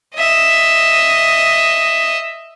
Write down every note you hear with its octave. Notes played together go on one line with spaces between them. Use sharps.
D#5 E5